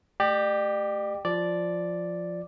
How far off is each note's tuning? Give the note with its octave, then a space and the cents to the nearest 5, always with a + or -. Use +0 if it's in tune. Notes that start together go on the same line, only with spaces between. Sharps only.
A3 -5 G4 +0 D5 +40
F3 +0 D5 +0